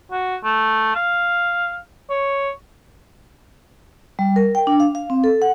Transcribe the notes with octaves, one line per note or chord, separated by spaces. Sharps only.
F#4
A3
F5
C#5
G3
A#4
G5
D4
F5
F5
C4
A4
F#5